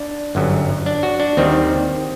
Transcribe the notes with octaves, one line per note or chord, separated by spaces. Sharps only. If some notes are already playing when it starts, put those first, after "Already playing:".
Already playing: D4
G1 F#2 F#3
D4
F#4
D4
D#2 D#3 G3 C4